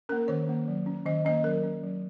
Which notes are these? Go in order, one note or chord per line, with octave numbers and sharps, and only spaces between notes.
A#3 C#4 A#4
D#3 C#5
A#3 C#4
F#3
C#4
D#3 D#5
A#3 C#4 D#5
F#3 A#4
C#4
F#3